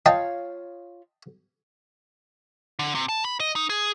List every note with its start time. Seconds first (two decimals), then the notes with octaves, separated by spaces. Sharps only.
0.06 F4 C#5 D#5 F5 G5 A5
2.79 D3
2.95 C3
3.09 A5
3.25 B5
3.40 D#5
3.56 D#4
3.70 G#4